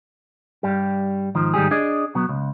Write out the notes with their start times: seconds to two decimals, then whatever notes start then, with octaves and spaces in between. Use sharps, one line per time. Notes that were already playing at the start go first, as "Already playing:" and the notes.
0.63 G2 G3 G4
1.35 G#2 D#3 F3
1.54 G#2 D#3 G3 G4 G#4
1.71 D4 G#4 D5 D#5
2.15 B2 F#3 B3
2.29 C#2